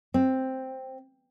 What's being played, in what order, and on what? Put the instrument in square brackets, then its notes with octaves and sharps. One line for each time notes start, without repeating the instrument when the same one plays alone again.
[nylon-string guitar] C4